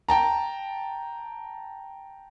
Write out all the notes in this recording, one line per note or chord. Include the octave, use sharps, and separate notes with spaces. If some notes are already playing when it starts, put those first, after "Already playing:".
G5 A5 A#5